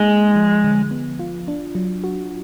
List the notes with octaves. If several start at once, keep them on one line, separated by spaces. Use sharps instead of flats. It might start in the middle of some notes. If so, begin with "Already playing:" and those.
Already playing: G#3 A#3 D#4
G#4
F3
D3
B3
F4
D4
F#3
F#4